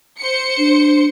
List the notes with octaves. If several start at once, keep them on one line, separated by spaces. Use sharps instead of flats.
C5 C#7
D4